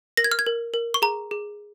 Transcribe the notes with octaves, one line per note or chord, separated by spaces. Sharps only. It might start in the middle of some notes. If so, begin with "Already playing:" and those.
A#4 A#6
G#6
F6
G#6
A#4
A#4
C#6
G#4 A#5
G#4